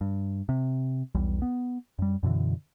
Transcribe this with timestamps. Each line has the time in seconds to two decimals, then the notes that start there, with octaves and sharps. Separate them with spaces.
0.01 G2
0.49 C3
1.15 B1 E2 G3
1.42 B3
1.99 F#2 G3
2.23 F#2 B2 D3 E3